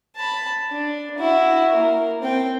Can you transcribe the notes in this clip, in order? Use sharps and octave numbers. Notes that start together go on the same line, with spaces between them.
A5 B5
D4
E4 F#4
A#3 A#4
C4 G5